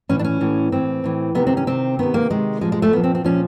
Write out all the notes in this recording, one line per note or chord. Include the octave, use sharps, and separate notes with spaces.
A2 E3 C#4
D4
C#4
A2 E3
A2 E3 C4
A2 E3
C3 D#3 B3
C4
C#4
C3 D#3 C4
C3 D#3 B3
A#3
C3 D#3 G#3
A#2 F3 G#3
G#3
A3
A#2 F3 B3
C4
C4
A#2 F3 C#4